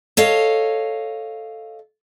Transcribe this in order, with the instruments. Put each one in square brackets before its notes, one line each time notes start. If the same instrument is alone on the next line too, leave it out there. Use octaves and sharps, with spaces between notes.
[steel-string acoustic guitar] A4 C#5 D#5 F5